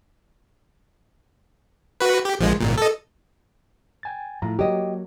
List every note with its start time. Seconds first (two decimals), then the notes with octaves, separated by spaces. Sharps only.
2.01 F#4 B4
2.25 G4
2.39 A#1 F3 G#3
2.60 G#1 A#2
2.77 A4 D#5
4.03 G5 G#5 A6
4.42 A2 F3 F4 A#5
4.59 F#3 A#3 G4 D#5